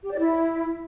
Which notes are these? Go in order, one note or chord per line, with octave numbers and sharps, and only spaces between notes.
G4
D5
E4